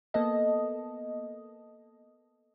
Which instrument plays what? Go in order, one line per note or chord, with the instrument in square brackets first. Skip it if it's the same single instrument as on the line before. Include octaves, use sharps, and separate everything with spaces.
[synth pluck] A#3 B3 A4 D#5